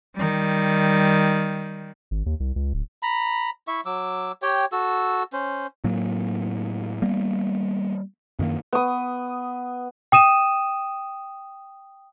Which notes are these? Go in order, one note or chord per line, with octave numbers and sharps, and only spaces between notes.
D#3 G3
G#1
D#2
C2
C#2
D1
A#5 B5
E4 E5 C#6
F#3 D6 E6
G4 C#5 G5
F#4 A4 E6
C#4 C5
A2 F#3 A#3
G3 A#3 B3
F#2 D#3 A#3
B3 D#6
G5 D#6 D#7 E7